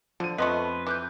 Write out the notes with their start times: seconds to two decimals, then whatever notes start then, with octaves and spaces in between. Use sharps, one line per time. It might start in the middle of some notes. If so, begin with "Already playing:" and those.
0.20 D3 F3 D#7
0.38 F2 A3 B3 B4 D#5 C6 C#6
0.87 E3 D6 F#6 G6